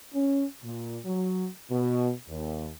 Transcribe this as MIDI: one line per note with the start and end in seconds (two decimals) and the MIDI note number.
0.14 0.45 61
0.64 0.99 46
1.06 1.47 54
1.71 2.10 47
2.29 2.70 39